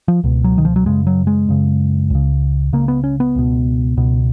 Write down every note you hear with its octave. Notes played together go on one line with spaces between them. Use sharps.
F3
C#2 B2
F#3
D#3
F3
F#3
F#2 C#3 G#3
F#3
G#3
F#2 C#3
C#2 C#3
C#2 C#3 A#3
B3
C#4
B3
C#2 B2
C#2 B2